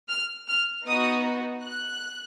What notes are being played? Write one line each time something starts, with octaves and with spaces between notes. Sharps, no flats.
F6
F6
B3 D#4 F#4 D#6
F#6